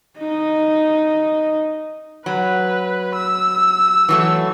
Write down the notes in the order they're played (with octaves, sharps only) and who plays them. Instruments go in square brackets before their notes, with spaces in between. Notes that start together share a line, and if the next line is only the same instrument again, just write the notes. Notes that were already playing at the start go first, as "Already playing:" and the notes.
[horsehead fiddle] D#4 D#5
[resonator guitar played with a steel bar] F#3 [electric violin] B4
[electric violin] E6
[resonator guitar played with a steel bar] E3 F#3 A3